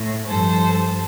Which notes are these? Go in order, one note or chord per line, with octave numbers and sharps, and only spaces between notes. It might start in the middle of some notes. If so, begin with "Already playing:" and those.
Already playing: A2
G2 F3 A4 C5